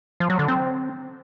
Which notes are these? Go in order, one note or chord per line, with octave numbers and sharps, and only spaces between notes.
F3
F#3
D3
C4